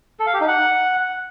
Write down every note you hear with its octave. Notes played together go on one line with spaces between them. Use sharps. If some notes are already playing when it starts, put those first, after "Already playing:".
A4
F5
G4
D#4
F#5